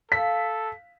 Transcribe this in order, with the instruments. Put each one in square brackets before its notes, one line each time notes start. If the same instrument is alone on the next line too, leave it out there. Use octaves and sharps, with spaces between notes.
[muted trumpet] A4 [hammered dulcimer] F5 [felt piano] B6